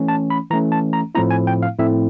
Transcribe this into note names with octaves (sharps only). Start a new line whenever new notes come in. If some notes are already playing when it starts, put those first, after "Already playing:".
Already playing: E3 A3 C#4
A5
B5
E3 A3 C#4 A#5
A5
A#5
A2 F3 A3 C4 E4 A#5
G#5
G5
F5
A2 F3 A3 C4 E4 E5